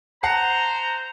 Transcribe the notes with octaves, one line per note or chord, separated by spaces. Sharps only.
C5 F#5 A5 A#5 C7